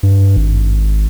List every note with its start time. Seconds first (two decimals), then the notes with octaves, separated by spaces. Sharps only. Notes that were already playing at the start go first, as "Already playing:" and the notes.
0.03 G2
0.36 G#1